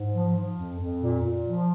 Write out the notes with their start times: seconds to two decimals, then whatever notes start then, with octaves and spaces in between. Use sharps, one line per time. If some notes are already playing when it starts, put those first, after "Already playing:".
Already playing: G#2
0.13 F3
0.36 F3
0.57 F2
0.79 F2
1.01 A#2
1.22 A#2
1.44 F3